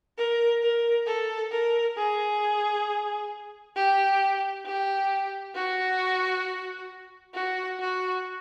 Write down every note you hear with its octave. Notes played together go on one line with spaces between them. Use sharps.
A#4
A#4
A4
A#4
G#4
G4
G4
F#4
F#4
F#4